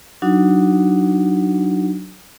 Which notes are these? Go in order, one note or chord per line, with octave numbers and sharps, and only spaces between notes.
F#3 D4 D#4 F#4